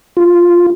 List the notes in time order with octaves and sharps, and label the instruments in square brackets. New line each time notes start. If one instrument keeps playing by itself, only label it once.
[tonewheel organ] F4